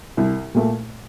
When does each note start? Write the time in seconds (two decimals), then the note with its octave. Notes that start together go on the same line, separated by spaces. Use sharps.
0.17 C2
0.55 A#2 A3